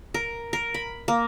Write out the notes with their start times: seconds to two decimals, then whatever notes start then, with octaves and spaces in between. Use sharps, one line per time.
0.14 A#4
0.53 A#4
0.74 B5
1.08 A#3